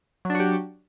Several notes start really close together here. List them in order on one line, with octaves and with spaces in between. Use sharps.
F#3 D4 F#4 G4